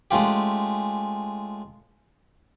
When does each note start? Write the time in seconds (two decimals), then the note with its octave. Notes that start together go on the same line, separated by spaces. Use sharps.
0.11 G#3 A3 C#4 F4 G4